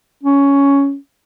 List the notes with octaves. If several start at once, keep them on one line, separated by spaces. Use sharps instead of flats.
C#4